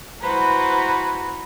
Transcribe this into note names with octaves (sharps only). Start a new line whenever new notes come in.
E4 F#4 B4 C5 G#5 A#5